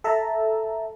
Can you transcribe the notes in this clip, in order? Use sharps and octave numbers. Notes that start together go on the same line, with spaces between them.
A4 E5 A5 A#5